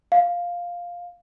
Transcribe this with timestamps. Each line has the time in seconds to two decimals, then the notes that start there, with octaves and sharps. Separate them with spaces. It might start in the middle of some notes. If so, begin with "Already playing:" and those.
0.12 F5